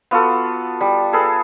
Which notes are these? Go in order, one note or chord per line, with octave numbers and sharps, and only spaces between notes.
B3 F4 F#4 A4
G3
G#4 A4 B4